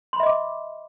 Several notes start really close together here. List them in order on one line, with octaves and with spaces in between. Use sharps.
C6 B5 E5 D#5 D6